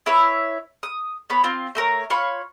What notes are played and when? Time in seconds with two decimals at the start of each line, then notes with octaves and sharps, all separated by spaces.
0.06 E4 B4 C#5 E5
0.83 D#6
1.30 B3 C#5 B5
1.44 C4 F4
1.75 A3 A4 A#4 C#5
2.10 F4 C#5 B5 C#6